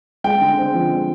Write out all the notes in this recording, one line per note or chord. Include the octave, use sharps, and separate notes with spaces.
G#3 G5
D3
C4
F3
G#3